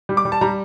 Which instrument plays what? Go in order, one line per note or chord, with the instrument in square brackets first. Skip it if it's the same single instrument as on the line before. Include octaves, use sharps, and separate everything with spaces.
[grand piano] G3
D6
G3
A5
G3 A#5